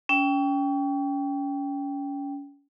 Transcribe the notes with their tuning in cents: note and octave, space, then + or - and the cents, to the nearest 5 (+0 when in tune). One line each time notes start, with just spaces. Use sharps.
C#4 +30 G5 +0